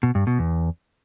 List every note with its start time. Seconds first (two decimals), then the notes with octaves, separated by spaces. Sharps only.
0.03 B2
0.15 G2
0.27 B2
0.39 E2